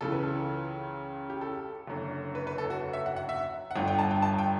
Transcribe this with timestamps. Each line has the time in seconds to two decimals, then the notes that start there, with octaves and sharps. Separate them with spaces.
0.01 C#2 C#3 E3 A4
0.12 B4
0.23 A4
1.30 G4
1.41 A4
1.87 F#1 F#2 D3
2.35 B4
2.47 B4
2.58 A4
2.70 F#4
2.93 E5
3.06 F#5
3.16 F#5
3.29 E5
3.71 F#5
3.76 G1 G2 D3 G5
3.88 G5
3.99 A5
4.11 G5
4.22 A5
4.38 G5